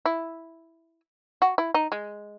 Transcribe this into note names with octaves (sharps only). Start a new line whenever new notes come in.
E4
F#4
E4
D#4
G#3